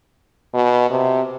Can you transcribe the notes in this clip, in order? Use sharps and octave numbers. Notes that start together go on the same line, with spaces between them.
B2
C3